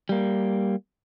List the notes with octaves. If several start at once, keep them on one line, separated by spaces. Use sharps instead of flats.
G3 A#3